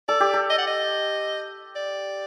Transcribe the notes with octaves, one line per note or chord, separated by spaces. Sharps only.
A4 D5
G4
A4
D#5
F#5
D#5
D5